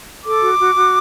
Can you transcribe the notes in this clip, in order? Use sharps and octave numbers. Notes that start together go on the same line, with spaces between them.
A4 D6
F#4
F#4
F#4